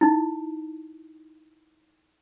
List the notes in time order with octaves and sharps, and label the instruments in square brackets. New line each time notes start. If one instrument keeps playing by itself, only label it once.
[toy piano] D#4 E4